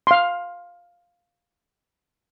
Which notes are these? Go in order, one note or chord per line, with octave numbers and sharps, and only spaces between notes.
F5 C6